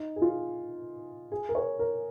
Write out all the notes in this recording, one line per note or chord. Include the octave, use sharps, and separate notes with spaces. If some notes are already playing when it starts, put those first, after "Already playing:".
Already playing: D#4
G#4
F4
G#4
A#4
C#5
A#4